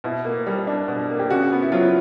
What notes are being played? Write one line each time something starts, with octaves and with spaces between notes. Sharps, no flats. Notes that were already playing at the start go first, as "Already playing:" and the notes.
B2 E4
A#3
G3
D4
B2
A#3
G4
C#3 F#4
B3
E4
F#3 F4
E4